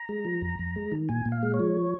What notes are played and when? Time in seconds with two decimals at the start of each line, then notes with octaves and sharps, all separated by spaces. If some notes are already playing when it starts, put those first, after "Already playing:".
Already playing: A#5
0.09 G#3
0.25 F3
0.42 F2
0.59 F2
0.76 G#3
0.92 D#3
1.09 A#2 G#5
1.26 A#2
1.32 F5
1.43 G#3
1.54 C#5
1.59 F3